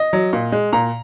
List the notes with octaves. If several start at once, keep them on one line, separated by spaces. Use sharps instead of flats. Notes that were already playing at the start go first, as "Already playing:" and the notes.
Already playing: D#5
F#3
A#2
G#3
A#2 A#5